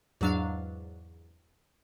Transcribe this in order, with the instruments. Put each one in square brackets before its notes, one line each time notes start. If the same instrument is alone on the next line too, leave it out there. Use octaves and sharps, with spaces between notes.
[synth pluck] E2 G#2 F#3 D4 F5